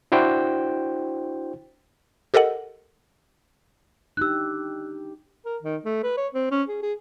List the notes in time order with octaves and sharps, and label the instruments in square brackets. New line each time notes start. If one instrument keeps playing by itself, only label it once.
[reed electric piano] D4 E4 F#4 C5 G5
[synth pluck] G4 A4 A#4 D#5 F#5
[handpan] D4 D#4 G4 [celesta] E6 F#6
[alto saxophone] A#4
D#3
A3
B4
C#5
C4
C#4
G#4
G#4